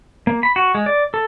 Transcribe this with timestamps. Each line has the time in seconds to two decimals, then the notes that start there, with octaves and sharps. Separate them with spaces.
0.27 A#3
0.43 B5
0.56 F#4
0.75 G#3
0.86 D5
1.14 A4